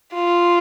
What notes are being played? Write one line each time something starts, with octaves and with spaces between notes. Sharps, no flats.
F4